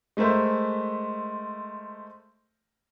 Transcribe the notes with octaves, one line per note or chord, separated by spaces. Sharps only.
G#3 A3 A#4 C5 E5